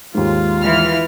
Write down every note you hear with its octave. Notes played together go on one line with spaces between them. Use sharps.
D#2 G#2 F4
E3 F6